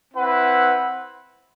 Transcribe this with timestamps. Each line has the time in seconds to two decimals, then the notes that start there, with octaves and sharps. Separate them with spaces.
0.14 C4 E4 B4 F#5